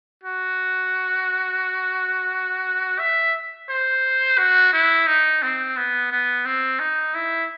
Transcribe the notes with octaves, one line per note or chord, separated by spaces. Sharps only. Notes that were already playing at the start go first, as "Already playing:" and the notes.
F#4
E5
C5
F#4
E4
D#4
C4
B3
B3
C4
D#4
E4